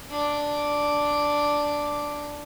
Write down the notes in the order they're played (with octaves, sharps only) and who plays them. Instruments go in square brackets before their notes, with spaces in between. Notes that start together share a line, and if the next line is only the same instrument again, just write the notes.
[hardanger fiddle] D4 D6